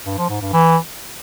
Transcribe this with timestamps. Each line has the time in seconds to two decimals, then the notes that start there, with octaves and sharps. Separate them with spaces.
0.06 G2
0.18 F3
0.30 G#2
0.41 G2
0.53 E3